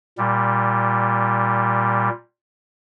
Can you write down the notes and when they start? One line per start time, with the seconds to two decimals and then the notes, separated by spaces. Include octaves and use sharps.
0.18 A#2 G3